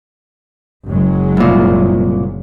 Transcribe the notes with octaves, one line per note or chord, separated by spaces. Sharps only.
F#1 F#3 G#3
C2 A#2